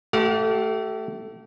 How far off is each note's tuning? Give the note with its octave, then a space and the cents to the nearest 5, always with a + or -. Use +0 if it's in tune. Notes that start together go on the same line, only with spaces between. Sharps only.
A3 +0 G4 -35 F5 +40